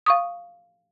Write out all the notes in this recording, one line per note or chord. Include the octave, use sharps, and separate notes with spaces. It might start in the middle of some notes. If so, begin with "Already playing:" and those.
F5 C#6 D#6